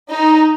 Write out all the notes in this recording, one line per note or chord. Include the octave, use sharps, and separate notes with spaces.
D#4